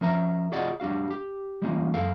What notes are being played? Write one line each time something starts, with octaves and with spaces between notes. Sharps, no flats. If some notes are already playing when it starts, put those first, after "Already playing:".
F3 C#4 A#4 E5 A#5
F4 F#4 G#4 D5 D#5 F#5
G3 D4 F#4 F5
G4
E3 G3 G#3 A#3 C#4 F4
F#2 A4 A#4 F5